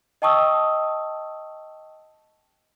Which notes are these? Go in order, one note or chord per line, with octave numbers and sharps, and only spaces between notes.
D#5 G5 A5 C#6 D#6 E6